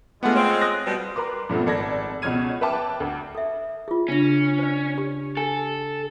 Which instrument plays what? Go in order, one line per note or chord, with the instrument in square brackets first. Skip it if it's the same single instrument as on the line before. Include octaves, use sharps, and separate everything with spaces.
[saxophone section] G2 D5 F#5 [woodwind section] G#3 F4 [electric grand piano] A3 B3
[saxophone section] C4 [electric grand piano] C#5
[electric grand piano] D#6 F#6 A#6
[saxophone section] B2 G3
[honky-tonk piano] A#4 B4 C6 D6
G2 A#2 A3 B3 C4
G#1 A4 D5 G#6 A#6
C#2 B2 C#5 F6 G#6 D#7
B4 E5 G5 A5 D6
D2
[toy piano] A4 E5
F4 G#4
[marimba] C#3 D4 A#6 [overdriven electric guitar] C#4
[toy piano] C5 D5
G4
[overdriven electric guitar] A4 [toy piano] G#5